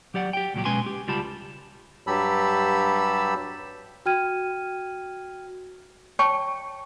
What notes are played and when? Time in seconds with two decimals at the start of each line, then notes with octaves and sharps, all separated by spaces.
0.14 F#3 G4 D5 F#5
0.33 G4 G5
0.54 C#2 A#2 F#3 G4
0.65 B2 G#3 C#4 B4 G#5 C6
0.86 G4
1.08 C#2 G3 F4 G4 A5 B5
2.07 G2 F#3 G4 A5 B5 E6
4.06 F#4 G5 F6 G#6 D#7
6.19 C#5 G5 A5 C#6